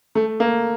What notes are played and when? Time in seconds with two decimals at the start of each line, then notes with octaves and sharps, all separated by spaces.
0.15 A3
0.40 A#3